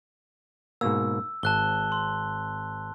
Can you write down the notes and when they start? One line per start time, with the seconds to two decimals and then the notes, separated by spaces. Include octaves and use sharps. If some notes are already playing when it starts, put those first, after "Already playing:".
0.81 G#2 B2 A#3 E6
1.43 G#1 A5 F#6 G7
1.92 C6